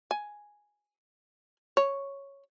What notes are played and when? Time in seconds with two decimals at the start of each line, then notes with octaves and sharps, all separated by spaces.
0.11 G#5
1.77 C#5